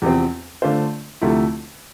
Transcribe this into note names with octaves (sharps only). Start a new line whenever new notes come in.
E2 C3 F3 C4
D3 A3 D4 F4 C5
D2 C3 F3 A3 E4